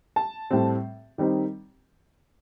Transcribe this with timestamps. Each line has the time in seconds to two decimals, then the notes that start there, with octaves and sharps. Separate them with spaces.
0.16 A5
0.51 A2 G3 C4
1.18 D#3 G3 C4 D#4